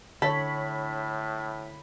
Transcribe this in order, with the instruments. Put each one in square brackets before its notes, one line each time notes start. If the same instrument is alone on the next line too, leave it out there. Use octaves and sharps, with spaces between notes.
[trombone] A2 [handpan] D3 C#5 [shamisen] A4 [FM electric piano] B5